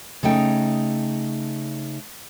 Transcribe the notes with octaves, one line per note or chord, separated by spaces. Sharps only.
C#3 A3 D#4 G5